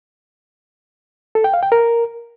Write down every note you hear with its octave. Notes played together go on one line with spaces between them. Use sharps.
A4
G5
F5
G5
A#4